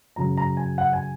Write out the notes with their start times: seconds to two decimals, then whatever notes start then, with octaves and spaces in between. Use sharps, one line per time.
0.16 F#2 C#3 F#3 A#5
0.37 A#5
0.57 G#5
0.78 F#5
0.93 G#5